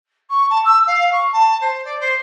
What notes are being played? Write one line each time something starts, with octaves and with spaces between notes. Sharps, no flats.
C#6
A5
E6
F5
C#6
A5
C5
D5
C5